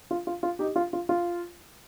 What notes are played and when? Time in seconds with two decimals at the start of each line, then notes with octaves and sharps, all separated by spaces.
0.11 F4
0.27 F4
0.43 F4
0.59 D#4 G4
0.76 F4
0.93 F4
1.09 F4